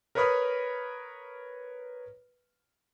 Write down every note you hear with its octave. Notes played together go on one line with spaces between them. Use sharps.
A#4 B4 C#5 B5 D#6 F6